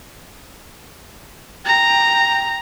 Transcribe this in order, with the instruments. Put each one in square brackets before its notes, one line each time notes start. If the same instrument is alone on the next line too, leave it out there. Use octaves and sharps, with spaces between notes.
[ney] G5 [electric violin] A#5